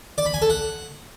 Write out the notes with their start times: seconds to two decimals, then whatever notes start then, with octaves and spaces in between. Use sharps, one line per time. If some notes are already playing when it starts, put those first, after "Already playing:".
0.18 D5
0.26 B5
0.34 G#5
0.42 A4
0.50 F#5